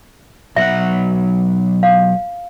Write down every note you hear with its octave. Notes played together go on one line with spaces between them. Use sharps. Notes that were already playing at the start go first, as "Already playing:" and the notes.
B1 E5 F#5
F5